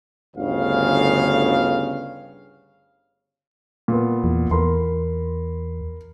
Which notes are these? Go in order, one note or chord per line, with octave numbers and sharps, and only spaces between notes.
G1 D2 C#3 F5
A#2 B3
E2
E2 A#4 B5 C6